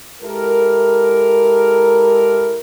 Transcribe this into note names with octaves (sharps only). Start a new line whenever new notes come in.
G#3 E4 G4 A4 A#4